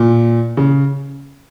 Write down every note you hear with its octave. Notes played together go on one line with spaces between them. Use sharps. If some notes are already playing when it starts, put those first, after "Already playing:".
Already playing: A#2
C#3